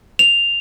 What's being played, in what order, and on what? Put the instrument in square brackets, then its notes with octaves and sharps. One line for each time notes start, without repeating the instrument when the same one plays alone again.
[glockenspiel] F7